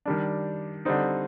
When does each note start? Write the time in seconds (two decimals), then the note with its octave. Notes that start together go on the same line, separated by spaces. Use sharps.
0.06 D#3 G3 D4
0.85 D3 G3 C4 D#4